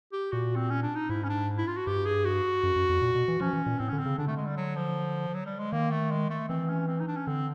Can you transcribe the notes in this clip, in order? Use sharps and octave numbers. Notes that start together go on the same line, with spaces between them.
G4
A#2 F#4
C4
C#4
D4
D#4
G#2 E4
C#4
D4
E4
F4
F#4
G2 G4
G#4
F#4
F#2
F#2
F2
A#2
B2
E3
F3 C#4
E3
A#2
A2 C4
D3 C#4
C4
C#3
D3 D4
A3
G#3
G3
F#3
F3
F#3
G3
G#3
D#3 A#3
A3
G#3
A3
E3 C4
C#4
C4
D#4
D4
C#4
D3 C4